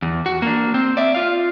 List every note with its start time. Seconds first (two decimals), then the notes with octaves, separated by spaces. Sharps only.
0.02 E2
0.26 F#4
0.42 A#3 D4
0.74 C4
0.97 D5 E5
1.14 F4 F5